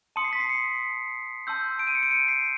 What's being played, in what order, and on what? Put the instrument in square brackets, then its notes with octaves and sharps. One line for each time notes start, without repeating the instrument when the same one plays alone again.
[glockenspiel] A5 C6 D#6 C#7
C7
B6
C7
C#7
A5 C6 E6 G6
D7
D#7
C#7
D7
C#7
C7